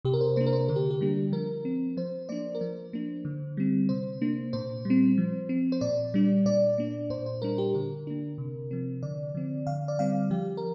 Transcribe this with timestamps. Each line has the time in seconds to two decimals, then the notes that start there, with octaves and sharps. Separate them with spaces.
0.05 C3 G4
0.14 A#4
0.21 C5
0.36 A#3 D4 C5
0.46 A#4
0.53 C5
0.68 D3 A#4
0.76 G4
0.90 G4
1.01 G3 A#3 D4
1.32 F3 A#4
1.65 C4
1.97 F3 C5
2.29 A#3 D4 D5
2.55 A#4
2.61 F3 C5
2.93 A#3 D4
3.25 D3
3.57 G3 C4
3.89 C3 C5
4.21 A#3 D4
4.53 A#2 C5
4.85 G3
4.90 C4
5.18 F3
5.49 C4
5.72 C5
5.81 A#2 D5
6.14 G3 D4
6.46 A#2 D5
6.78 A#3 D4
7.10 A#2 C5
7.26 C5
7.42 G3 D4 A#4
7.58 G4
7.74 D3 A#4
8.07 A#3 D4
8.38 C3
8.71 F3 C4
9.03 D3 D5
9.35 F3 C4
9.67 D3 F5
9.88 D5
9.99 G3 C4 F5
10.31 F3 G4
10.57 A#4